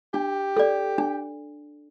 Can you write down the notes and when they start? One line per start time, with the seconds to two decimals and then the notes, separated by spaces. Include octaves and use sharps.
0.14 D4 G4
0.57 A4 D5
0.98 D4